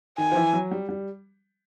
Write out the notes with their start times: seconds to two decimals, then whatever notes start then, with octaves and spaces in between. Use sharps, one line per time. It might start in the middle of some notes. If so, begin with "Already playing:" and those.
0.18 D#3 G#5
0.32 F3
0.36 E3
0.53 F#3
0.71 G3
0.89 G3